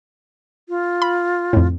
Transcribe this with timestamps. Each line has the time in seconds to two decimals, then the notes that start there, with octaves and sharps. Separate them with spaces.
0.69 F4
1.02 B5
1.53 F2 A2